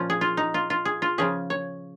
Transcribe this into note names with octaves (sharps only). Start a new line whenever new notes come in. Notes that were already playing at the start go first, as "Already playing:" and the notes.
Already playing: A#2 F3 C#4
G#4
F4
D#4
F4
F4
G#4
F4
C#3 F3 C#4 G#4
C#5